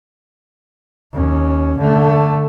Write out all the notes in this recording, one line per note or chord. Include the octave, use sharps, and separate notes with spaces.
D#2 C#4
D3 A3